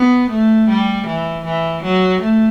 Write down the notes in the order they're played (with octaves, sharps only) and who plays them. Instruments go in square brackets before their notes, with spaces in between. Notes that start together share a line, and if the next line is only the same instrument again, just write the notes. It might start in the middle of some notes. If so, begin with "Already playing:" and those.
Already playing: [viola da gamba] B3
A3
G3
E3
E3
F#3
A3